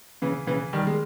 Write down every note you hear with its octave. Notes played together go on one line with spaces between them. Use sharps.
C#3 E3
C#3 E3
D#3 G3
G#3